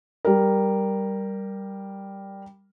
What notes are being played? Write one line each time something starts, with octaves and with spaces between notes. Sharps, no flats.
G3 A#4